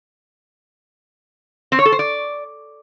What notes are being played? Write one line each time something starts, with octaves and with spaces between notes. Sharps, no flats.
C4
C#5
A4
C5
D5